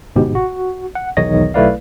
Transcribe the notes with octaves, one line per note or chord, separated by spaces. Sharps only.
G1 G#2 B2 G4
F#4
F#5
B1 E2 D#3 C#5 D#5 A#6
B1 A3 E4 B4 D5 F5